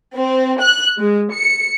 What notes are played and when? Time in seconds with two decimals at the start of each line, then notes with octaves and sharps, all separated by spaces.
0.15 C4
0.60 F#6
0.98 G#3
1.32 C#7